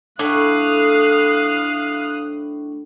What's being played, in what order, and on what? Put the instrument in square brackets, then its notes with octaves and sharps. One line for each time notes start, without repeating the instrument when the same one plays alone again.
[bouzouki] A2 [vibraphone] D4 [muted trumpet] F5 [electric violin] D#6 F#6